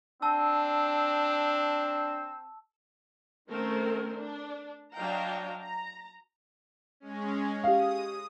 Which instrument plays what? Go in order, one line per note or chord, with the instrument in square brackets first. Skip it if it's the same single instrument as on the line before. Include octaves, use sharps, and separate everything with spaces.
[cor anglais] C4 [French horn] D4 [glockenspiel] A5 E6
[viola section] D#3 A3 C4 C#4 A#4 C5
D4
F#3 D4 D#5 F5 G5 A#5
A#5
[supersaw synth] G#3 C#4
[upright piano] G4 F5 [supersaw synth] D#6